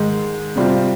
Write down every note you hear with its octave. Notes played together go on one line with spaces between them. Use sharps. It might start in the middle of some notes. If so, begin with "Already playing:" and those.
Already playing: G#2 D#3 G#3
C3 G3 C4 F4